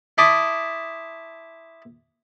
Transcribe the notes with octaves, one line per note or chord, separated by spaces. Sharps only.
E4 A5 C6 D6 D#6